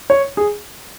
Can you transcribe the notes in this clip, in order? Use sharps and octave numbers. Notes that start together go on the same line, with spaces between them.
C#5
G#4